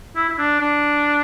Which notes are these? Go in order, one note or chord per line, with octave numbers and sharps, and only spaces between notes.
E4
E4
D4
D4